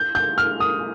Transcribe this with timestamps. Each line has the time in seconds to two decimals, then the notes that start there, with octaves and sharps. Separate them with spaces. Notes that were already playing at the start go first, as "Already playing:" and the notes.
Already playing: G6
0.15 G6
0.38 F6
0.60 D#6